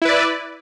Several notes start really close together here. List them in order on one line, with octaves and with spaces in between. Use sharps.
E4 B4 D5